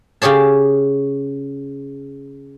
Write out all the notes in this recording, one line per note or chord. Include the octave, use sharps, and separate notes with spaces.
C#3 G4 G#4 C#5 A5